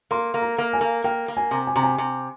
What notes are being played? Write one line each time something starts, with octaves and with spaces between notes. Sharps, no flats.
A#3 C6
A#3
A#5
A#3
G#5
A#3
A#3 G5
A#3
G#5
C3
G#5
C3 A#5
G#5
C3